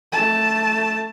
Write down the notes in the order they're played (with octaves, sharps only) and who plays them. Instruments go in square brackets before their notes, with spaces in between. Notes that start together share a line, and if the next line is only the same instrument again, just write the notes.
[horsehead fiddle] A3 A5